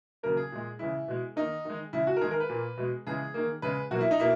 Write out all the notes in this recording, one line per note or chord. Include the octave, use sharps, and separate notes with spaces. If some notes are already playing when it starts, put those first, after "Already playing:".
C#3 F#3 A#3 A#4
G#4
A#2 G#3
C#3 E3 G#3 E4
B2 G#3
D#3 A#3 D#4
D#3 G#3
C#3 G#3 E4
F#4
A#4
D#3 G#3 G#4
A#4
B4
A#2 A#3
B2 G#3
C#3 E3 G#3 G#4
D#3 A#3
C#3 G#3 B4
B2 F#3 A#3 F#4
E4
D#4
B2 A#3 E4